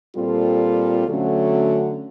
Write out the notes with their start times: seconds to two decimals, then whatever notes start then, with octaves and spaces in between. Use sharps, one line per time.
0.16 A#2 G3 C4 F4 A4
1.08 D3 F#3 A3 C#4 F#4